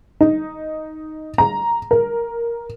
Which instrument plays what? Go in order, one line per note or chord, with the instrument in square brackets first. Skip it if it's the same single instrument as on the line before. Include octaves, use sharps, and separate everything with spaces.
[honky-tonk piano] D#4
A#5
A#4